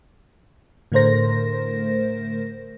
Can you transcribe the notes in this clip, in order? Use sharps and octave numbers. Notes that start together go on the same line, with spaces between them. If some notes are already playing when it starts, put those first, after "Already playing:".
A2 D3 A3 A#4 C5 A#6